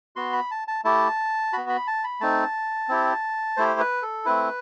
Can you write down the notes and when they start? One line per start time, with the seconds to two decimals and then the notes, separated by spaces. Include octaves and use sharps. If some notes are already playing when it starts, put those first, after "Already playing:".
0.16 B3 F#4 C6
0.33 B5
0.51 A5
0.68 A5
0.85 A3 E4 G4 A5
1.53 B3 F#4 B5
1.69 B5
1.87 A5
2.04 B5
2.20 A3 C4 D#4 A5
2.89 C4 E4 G4
3.57 A3 E4 G4 C5
3.80 B4
4.02 A4
4.25 A3 C4 E4 B4